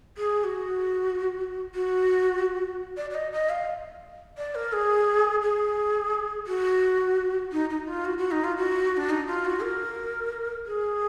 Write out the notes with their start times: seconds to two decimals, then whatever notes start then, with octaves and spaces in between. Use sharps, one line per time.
0.18 G#4
0.44 F#4
1.75 F#4
2.97 D5
3.10 D5
3.15 D#5
3.32 D#5
3.50 F5
4.38 D5
4.55 A#4
4.73 G#4
5.42 G#4
6.47 F#4
7.52 D#4
7.70 D#4
7.88 F4
8.05 F#4
8.18 F#4
8.31 D#4
8.44 F4
8.57 F#4
8.97 D4
9.10 D#4
9.27 F4
9.45 F#4
9.62 A#4
10.66 G#4